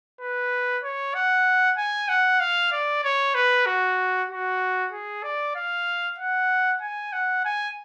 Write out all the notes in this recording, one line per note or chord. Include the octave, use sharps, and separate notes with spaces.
B4
C#5
F#5
G#5
F#5
F5
D5
C#5
B4
F#4
F#4
G#4
D5
F5
F#5
G#5
F#5
G#5